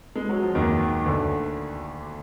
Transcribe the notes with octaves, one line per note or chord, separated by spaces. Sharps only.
G#3
F#3
F3
D#2 D#3
D2 D3